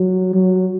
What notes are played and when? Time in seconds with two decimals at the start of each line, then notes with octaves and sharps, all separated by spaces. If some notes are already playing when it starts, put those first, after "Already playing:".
Already playing: F#3
0.34 F#3